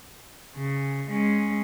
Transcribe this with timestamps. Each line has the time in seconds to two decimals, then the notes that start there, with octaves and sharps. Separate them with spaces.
0.56 C#3
1.11 G#3 C#4